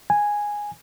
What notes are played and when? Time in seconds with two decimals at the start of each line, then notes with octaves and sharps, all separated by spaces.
0.10 G#5